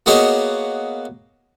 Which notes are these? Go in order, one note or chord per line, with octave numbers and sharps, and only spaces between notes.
A#3 B3 F#4 G#4 C#5 D#5